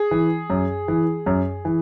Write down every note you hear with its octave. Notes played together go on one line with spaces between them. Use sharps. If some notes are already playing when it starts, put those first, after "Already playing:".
Already playing: G#4
E3
F#2
E3
F#2
E3